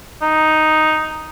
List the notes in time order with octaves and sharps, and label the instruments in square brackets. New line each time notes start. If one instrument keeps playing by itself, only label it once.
[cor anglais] D#4